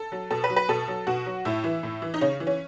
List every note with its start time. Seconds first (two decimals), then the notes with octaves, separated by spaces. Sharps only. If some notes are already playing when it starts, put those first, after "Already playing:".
Already playing: A4
0.12 F#3
0.31 B2 A4
0.44 B4
0.50 F#3
0.56 B4
0.69 B2 A4
0.88 F#3
1.07 B2 F#4
1.26 F#3
1.45 A2 E4
1.64 E3
1.83 A2
2.02 E3
2.14 D#4
2.21 C#3 C#4
2.40 E3
2.47 C#4